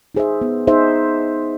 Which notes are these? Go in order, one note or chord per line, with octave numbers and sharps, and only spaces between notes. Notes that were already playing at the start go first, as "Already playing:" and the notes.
D#4 G#4 C5 E5
B3
D#4 G#4 C5 E5